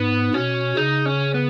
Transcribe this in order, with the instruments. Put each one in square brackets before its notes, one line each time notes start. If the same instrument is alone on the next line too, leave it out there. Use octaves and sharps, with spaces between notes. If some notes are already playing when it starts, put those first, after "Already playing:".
Already playing: [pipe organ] G#2 [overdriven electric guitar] B3
[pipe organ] B2 [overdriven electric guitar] C#4
[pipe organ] C#3 [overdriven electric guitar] D#4
[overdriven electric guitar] C#4
B3